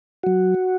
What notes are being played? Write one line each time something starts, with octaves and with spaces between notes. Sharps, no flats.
F#3 F#4